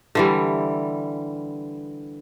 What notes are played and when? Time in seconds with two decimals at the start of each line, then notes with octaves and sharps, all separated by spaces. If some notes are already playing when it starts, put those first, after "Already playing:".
0.15 D3 E3 G3